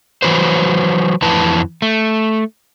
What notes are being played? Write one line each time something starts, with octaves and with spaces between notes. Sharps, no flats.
E3 F#3 B4 C5
F2 E3 B4 A5
A3